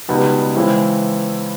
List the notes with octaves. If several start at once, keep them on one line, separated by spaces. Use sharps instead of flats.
C#2 B2 G3 B3 D#4
C#3 E3 G#3 C4 E4